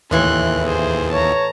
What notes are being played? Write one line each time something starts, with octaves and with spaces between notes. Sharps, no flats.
D#2 A2 E3 E4 C6 F#6
G#4 C5
C#5 A5 A#5